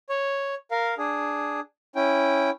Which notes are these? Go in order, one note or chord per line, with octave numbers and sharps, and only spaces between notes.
C#5
A#4 F5
D4 G#4
C#4 E4 G5